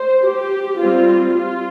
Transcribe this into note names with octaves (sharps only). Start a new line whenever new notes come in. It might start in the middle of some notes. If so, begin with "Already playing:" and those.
Already playing: C5
G4
G3 C4 F4
F4